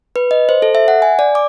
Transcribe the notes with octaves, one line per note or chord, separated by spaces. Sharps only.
B4
D#5
C5
A4
E5
F#5
G#5
D5
D6